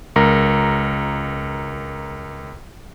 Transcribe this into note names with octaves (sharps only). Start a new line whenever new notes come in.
C#2 A#4 A#5